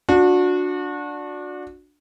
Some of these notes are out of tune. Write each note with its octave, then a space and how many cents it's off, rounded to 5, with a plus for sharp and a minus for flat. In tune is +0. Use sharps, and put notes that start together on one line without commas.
D4 +0 F#4 -30